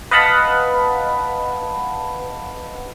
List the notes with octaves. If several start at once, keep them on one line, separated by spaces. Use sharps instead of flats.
B4 D#5 F5 F#5 A5 B5